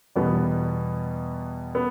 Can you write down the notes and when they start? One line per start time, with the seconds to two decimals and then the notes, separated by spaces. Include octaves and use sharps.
0.16 E2 B2 G3 B3
1.75 B3